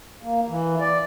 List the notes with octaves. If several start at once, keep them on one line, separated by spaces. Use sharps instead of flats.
A#3
E3
D5